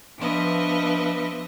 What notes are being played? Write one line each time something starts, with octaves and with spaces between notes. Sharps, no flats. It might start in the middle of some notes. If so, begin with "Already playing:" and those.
F3 B3 D4 B4 D#5 E5